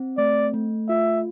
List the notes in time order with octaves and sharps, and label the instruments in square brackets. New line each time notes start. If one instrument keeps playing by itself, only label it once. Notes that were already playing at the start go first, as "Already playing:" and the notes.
Already playing: [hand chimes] C4
[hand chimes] A3 [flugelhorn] D5
[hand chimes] A3
[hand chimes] F4 [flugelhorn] E5